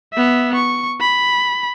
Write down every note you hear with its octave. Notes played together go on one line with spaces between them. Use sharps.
B3 E5
C#6
B5